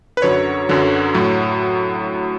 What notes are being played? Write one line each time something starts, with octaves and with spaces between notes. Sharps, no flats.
B4
F#2 D3 F#3 C#5
F#2 D3 F#3
A2 F#3